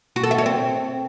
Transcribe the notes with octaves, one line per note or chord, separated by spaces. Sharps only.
F#4
A4
E5
C#5
C4